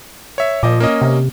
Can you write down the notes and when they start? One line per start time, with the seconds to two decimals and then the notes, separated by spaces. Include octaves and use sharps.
0.38 C#5 E5
0.63 A#2 F3 D#5 D6
0.80 A#3 C#4 D#5
1.02 C3